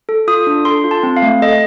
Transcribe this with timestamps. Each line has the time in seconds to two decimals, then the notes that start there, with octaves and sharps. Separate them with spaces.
0.09 A4
0.28 F4 D#6
0.47 D4
0.65 A4 C6
0.84 F4
0.91 A5
1.03 C4
1.16 F5
1.22 A3
1.42 A4 D#5